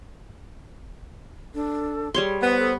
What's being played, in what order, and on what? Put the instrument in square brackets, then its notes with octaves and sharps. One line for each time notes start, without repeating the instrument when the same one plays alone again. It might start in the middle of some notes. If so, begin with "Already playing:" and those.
[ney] D4 [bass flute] A4
[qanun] G3 C#5 C6 [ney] G#4
[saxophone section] B3 [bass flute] C5 [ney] F#5
[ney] A4